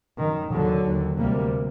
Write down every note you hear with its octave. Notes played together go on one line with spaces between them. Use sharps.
F#2 D#3
D#2 D3 F#3
D#2
D2 C3 G3 A#3